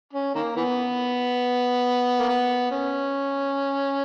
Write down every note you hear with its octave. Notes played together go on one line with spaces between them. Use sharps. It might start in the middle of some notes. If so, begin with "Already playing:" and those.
C#4
D#3 A#3
E3 B3
A#3
B3
C#4